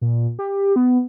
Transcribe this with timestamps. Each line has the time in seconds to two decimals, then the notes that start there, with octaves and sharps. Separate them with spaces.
0.01 A#2
0.39 G4
0.76 B3